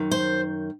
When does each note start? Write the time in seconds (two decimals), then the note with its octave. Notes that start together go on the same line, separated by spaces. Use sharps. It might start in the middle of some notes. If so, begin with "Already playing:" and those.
Already playing: F#2 D#3
0.11 C5